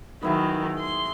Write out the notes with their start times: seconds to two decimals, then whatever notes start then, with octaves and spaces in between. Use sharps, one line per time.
0.22 D#3 F#3 B3 E4 G#4
0.80 C6